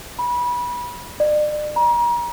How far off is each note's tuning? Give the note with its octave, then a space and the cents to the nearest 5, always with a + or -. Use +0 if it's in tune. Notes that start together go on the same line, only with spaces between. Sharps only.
B5 -25
D5 +40
A#5 +35